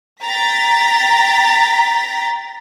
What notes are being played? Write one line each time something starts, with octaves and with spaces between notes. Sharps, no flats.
G5 A#5 A6 B6